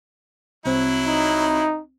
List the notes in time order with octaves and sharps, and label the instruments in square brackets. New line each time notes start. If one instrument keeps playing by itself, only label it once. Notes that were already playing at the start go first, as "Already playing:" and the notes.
[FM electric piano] C2 C4 [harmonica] F#3 E4
[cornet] D#4